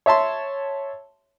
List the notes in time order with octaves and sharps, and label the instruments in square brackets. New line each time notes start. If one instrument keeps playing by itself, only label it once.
[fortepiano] C#5 E5 A5 C6